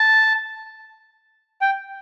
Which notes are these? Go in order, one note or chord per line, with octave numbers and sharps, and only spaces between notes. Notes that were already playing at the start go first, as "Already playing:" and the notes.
Already playing: A5
G5